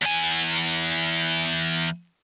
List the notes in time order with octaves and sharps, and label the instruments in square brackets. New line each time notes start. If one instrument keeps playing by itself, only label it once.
[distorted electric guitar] E2 G#5